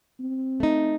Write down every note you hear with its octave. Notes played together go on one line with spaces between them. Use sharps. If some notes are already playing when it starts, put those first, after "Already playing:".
C4
A3 D#4